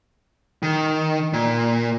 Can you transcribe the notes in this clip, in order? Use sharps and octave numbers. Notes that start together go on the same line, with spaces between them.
D#3
A#2